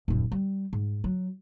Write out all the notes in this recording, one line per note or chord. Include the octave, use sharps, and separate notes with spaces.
D#1 F#2
G3
G#2
F#3